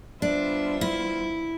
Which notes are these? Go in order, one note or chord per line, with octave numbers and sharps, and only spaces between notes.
G3 B3 D4 F4 C5 E5
E4